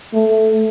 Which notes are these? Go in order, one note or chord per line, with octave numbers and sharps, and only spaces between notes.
A3